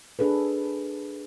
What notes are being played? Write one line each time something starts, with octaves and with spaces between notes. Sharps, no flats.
D4 G#4 A4 B4